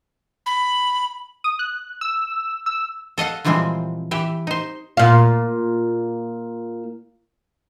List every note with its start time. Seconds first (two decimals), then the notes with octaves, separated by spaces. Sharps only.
0.46 B5
1.44 D#6
1.59 F#6
2.01 E6
2.66 E6
3.18 A4 D#5 F5 F#5
3.45 A#2 E3 F3 G3 G#3 C4
4.11 E3 G4 E5
4.47 D#4 C5
4.97 A#2 F4